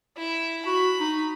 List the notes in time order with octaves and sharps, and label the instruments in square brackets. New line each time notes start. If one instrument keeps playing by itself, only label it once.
[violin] E4 E5
[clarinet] F#4 [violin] B5
[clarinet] D#4